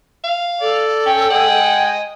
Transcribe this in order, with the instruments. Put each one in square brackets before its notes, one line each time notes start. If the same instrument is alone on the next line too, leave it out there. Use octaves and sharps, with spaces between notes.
[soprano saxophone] F5
[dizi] A4 [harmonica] D5
[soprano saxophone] C#4 [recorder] G5
[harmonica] D#5 G#5 [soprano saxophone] F#5